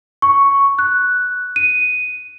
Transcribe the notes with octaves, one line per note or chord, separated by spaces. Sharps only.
C#6
F#6
D#7